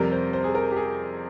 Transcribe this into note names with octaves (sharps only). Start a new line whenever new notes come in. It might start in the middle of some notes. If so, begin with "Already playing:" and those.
Already playing: F2 C3 G3 A#4
C5
C5
G#4
A#4
G4
G#4